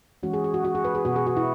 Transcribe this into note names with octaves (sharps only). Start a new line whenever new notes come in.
E3 G#3 C#4 F#4
G#4
G#4
F#4
F#4
G#4
B4
G#4
B2 B3 F#4
G#4
F#4
E4